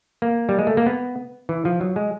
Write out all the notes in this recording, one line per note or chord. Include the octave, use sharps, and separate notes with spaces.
A#3
G3
G#3
A3
A#3
B3
E3
F3
F#3
G#3